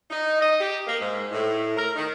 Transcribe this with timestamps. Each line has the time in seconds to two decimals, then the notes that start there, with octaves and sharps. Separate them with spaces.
0.10 D#4
0.40 D#5
0.59 G4
0.87 A#3
1.00 G#2
1.31 A2
1.77 A#4
1.96 D#3